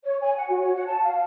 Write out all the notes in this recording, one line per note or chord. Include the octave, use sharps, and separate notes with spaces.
C#5
G#5
F#5
F#4
C#5
F#5
A5
F5